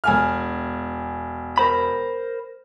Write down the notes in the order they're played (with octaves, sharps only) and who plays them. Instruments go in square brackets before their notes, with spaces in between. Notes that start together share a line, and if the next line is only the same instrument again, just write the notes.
[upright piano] E1 G#5 F6
[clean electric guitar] A#4 C5 B5